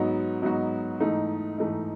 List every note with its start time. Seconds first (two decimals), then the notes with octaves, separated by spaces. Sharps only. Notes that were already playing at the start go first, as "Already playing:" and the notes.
Already playing: G#2 F#3 B3 D#4 F#4
0.42 G#2 F#3 B3 D#4 F#4
1.00 G#2 E3 A3 D#4
1.58 G#2 E3 A3 D#4